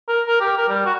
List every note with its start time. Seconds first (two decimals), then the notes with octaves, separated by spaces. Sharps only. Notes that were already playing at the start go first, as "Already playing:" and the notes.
0.08 A#4
0.27 A#4
0.41 G4
0.58 A#4
0.69 G3
0.85 F#4